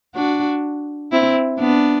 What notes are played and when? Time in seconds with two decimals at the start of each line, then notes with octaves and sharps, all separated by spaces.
0.15 D4 F#4
1.12 C4 E4
1.59 B3 D4